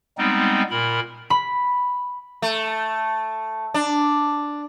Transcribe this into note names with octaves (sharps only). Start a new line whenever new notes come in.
G3 G#3 B3 C4 D#4
A#2 A#4 B5
B5
A3
D4